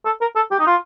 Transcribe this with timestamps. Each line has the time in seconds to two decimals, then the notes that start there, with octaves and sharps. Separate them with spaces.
0.05 A4
0.21 A#4
0.35 A4
0.51 G4
0.59 D#4
0.67 F4